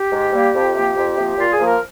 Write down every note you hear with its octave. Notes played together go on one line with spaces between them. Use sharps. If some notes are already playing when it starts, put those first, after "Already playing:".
Already playing: G4
G#2
G3 A#3
F2
C3 F3 A#3
F2
C3 F3 A#3
A#2 F4
G#4
F3 A#3
A#4